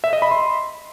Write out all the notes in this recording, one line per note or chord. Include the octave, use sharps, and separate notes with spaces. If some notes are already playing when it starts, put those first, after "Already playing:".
E5
D#5
B5
C6